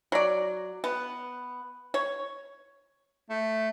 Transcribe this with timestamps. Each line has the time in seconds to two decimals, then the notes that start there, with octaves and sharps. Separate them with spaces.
0.12 F#3 D5
0.84 B3
1.94 C#5
3.30 A3